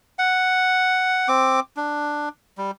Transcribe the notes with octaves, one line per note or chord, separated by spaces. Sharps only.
F#5
C4 D6
D4
G3